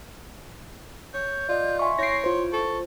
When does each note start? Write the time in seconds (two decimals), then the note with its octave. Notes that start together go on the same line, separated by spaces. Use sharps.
1.14 C#5 G6
1.49 F4 D5 D#5
1.79 E5 G#5 C6 C#6
1.99 E4 C#5 G6 A#6 C7 D7
2.24 F4 C5 C6
2.52 A4 C#6